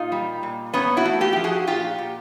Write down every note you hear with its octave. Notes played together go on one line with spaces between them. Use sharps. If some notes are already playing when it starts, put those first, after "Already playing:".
Already playing: A#2 D#4 F4
G3
A#2
A#2 B3 C#4
E4 F#4
A3
F4 G4
F3 G4
F#4 G#4
A#2 F4 G4
A#2